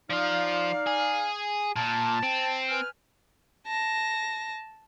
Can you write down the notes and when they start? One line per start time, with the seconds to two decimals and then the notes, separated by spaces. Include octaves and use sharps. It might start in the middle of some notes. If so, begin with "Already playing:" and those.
0.10 F3 D#4 F4 D5 F5
0.87 G#4
1.76 A#2 A5
2.23 C4
2.69 B4 G#5 F6
3.67 A5 A#6